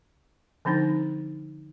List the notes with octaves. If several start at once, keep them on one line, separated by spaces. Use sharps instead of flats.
D3 F3 C4 D4 D#4